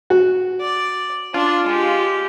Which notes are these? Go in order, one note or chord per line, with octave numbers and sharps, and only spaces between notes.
F#4
D5
D4 F4
G#3 G4